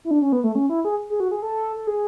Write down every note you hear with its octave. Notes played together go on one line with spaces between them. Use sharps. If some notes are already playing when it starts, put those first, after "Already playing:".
E4
D4
C#4
B3
A3
C#4
E4
G#4
G#4
F#4
G#4
A4
A4
G#4